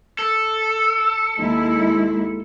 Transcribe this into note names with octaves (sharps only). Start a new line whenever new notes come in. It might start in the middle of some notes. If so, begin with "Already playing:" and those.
A4
D#2 G#3 E4